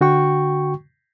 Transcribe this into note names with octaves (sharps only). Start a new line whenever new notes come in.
D3 F#4 G5 C#6